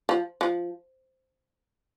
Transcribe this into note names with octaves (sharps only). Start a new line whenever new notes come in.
F3
F3